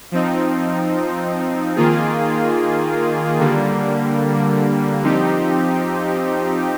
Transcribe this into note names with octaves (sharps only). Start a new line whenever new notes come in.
F3 C4 D#4
D#3 A#3 F4 G#4
D3 G3 A#3
F3 C4 D#4 G4